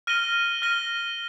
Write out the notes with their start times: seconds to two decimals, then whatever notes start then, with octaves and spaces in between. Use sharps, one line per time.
0.07 F6 A#6 D#7 G7
0.62 F6 A#6 D#7 G7